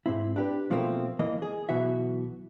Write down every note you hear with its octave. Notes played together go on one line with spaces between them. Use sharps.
G#2 C4 E4
D4 G4 B4
B2 F3 A3 A#3 C4
E3 A#3 D#5
G#4
B1 B2 E3 F#4 E5